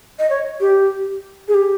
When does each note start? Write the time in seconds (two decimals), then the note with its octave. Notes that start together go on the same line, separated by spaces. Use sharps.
0.19 D#5
0.30 C#5
0.60 G4
1.48 G#4
1.54 G4